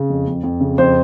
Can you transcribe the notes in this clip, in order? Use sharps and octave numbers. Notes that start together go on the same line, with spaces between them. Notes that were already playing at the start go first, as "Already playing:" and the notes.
Already playing: C#3
F2
F2
F2
C#3
F2 C5